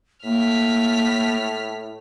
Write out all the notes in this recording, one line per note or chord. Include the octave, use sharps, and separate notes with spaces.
A2 A#3 F6 B6